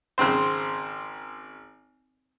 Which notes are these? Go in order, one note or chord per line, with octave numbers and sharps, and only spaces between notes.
G#1 C#3 C4 C5